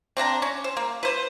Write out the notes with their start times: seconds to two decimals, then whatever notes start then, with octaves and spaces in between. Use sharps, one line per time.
0.17 C4 D4 F#5 A#5
0.42 C#4
0.64 C5
0.77 A#3
1.03 B4 C5